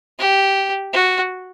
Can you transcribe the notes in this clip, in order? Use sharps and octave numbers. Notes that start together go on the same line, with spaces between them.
G4
F#4